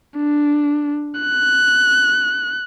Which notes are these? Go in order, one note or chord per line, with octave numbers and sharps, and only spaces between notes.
D4
F#6